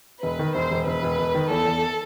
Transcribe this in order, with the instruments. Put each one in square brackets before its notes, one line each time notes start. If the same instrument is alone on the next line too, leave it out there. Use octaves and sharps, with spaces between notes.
[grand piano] E1 [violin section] B4
[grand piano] D#3
[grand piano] E1 [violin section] C5
[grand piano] E1
[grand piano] E1 [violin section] B4
[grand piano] E1
E1
D#3
[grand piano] E2 [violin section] A4
[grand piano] E2